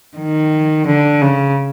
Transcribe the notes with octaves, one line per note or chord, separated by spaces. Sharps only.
D#3
D3
C#3